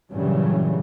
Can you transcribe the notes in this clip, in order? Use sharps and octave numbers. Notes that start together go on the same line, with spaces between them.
G2 A#2 C#3 E3 F#3 G3